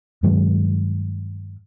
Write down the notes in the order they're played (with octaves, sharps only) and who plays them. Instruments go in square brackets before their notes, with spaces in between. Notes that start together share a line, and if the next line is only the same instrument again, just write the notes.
[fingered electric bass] G2 D#3 F#3 G#3